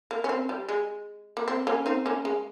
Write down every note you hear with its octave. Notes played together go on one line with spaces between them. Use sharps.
A#3
C#4
C4
G3
G#3
A#3
C4
A#3 C#4
C4 D#4
A#3 C#4
G#3